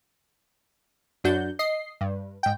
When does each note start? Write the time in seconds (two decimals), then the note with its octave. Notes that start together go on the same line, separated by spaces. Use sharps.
1.24 F#2 D4 F#4 G6
1.59 D#5 C7
2.01 G2
2.43 G#2 G5